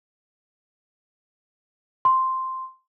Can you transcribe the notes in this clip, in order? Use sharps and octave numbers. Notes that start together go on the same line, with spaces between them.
C6